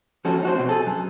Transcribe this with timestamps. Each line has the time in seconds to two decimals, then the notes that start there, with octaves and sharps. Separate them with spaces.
0.25 F3 G#3 C#4 F#4 A4
0.43 D#4 F#4 C5
0.55 B2 C4
0.69 G#4 A4
0.86 F#2